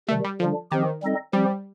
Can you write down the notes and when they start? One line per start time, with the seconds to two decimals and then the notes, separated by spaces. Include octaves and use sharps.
0.08 C3 D#3 G3 A3
0.24 G3
0.40 D3 F3 G3 D4
0.71 D#3 F3 C4 G4
1.02 G3 C4 D#4 A4 D#5
1.33 F3 G3 C4 G4